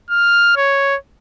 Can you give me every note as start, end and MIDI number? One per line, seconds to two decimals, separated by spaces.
0.10 0.54 89
0.57 0.96 73